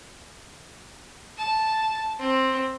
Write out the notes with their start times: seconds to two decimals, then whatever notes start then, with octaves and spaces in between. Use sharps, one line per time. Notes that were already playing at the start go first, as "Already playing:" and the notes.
1.38 A5
2.19 C4